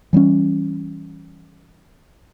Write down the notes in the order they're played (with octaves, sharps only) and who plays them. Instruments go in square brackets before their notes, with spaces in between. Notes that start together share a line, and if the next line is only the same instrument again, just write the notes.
[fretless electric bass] E3 G3 B3 C#4